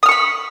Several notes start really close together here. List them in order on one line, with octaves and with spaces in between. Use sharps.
D#6 F6 C#6 B5